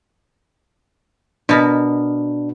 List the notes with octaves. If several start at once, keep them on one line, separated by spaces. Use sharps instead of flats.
B2 B3 D4 A#4